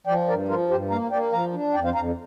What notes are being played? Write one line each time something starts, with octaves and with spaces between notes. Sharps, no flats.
F3 D5 G5
G2 A#4 D5
F3 F4 A#4
G2 G4 C5
A#3 F5 A#5
A#3 D5 G5
F3 F5 A#5
D4
F2 D5 G5
C5 F5
F2 F5 A#5